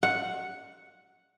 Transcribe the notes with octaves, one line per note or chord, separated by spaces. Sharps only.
F#5